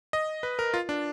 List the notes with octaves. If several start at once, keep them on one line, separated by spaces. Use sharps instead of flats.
D#5
B4
A#4
F4
D4